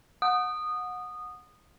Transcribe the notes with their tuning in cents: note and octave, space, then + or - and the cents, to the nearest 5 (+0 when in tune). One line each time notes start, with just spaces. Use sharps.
F#5 -25 D#6 -15